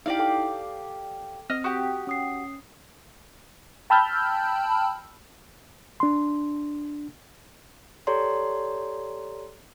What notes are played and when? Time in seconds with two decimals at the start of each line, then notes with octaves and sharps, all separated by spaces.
0.06 D#4 E4 G4 D5 F5
0.19 A4 G5 D6
1.50 C4 D#5 F6
1.64 F#4 G4 D#6
2.07 C#4 D#6 C7
3.90 G5 A5 B5 E6 F6 G6
6.00 D4 C6
8.07 G4 A4 C#5 D5 A#5 C6